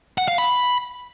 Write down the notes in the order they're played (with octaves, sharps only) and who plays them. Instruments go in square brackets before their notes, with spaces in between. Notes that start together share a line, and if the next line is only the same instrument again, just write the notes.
[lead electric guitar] F#5
F5
B5